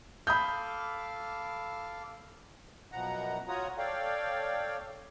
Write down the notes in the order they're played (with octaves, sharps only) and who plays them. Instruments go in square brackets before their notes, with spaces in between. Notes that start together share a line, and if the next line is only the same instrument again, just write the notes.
[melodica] A4 F5 D6 [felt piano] B5 D#6 G6
[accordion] F#2 B2 F3 F#5 A#5
F4 F#4 C#5 F#5 A#5 D#6
A4 C#5 D5 F5 G5